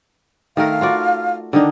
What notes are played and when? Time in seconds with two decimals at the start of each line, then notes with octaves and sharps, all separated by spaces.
0.57 D#3 A3 A#4 F5
0.81 F4 F#4 D5
1.53 D3 D#3 D4 D#4